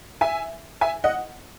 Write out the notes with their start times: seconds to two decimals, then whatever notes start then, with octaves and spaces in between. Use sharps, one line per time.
0.21 E5 G#5
0.81 E5 G#5
1.04 D#5 F#5